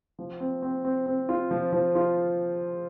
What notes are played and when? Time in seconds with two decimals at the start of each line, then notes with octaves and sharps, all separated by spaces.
0.19 F3
0.40 C4
0.62 C4
0.85 C4
1.06 C4
1.29 F4
1.51 F3
1.73 F3
1.95 F4